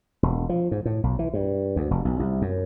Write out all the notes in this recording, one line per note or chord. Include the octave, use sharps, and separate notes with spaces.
E1
F3
G#2
A2
B1
E3
G2
D2
F1
B1
C2
F#2